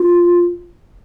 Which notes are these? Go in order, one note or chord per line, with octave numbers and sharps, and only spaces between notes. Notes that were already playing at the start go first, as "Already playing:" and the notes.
Already playing: F4